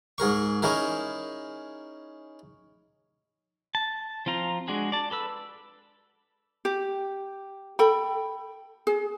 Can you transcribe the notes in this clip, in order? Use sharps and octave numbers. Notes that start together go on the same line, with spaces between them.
G#2 G#4 A#4 C#6
C#4 D#4 E4 G#4 A#4
A5
F3 C4 F4 A#5
G#3 D4 F#4 G#4
D5 A5
A4 B4 E6
G4
A4 G5 B5
G#4